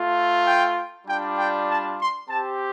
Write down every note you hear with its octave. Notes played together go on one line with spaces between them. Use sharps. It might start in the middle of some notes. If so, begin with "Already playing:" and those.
Already playing: A3 F4
G5
G3 D4 F4 G5
G5
A5
C6
C4 G4 A5